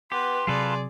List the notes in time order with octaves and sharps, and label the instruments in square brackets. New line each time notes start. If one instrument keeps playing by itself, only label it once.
[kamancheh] B3 B4 [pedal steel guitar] G4 [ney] C6
[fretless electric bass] C3 F#3 [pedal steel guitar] F4 A4 B4 [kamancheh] G#4 D5